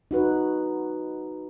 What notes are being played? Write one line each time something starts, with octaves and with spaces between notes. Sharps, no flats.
D#4 F#4 B4